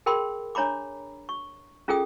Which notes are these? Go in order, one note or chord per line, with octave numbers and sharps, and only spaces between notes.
G#4 A#4 G5 B5 C6
D4 C#5 A#5 B5 D6
C#6
C#4 F4 G#4 A4 G5 D#6